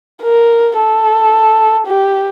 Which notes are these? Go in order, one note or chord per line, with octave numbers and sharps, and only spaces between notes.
A#4
A4
G4